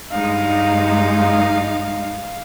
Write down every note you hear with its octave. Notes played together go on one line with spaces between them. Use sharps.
G2 G#3 D#4 F5